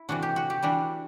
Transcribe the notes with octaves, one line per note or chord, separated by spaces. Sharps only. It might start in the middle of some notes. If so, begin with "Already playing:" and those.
Already playing: E4
C3 E3 A3 D4 F#4
G4
F#4
G4
E3 G3 D4 F#4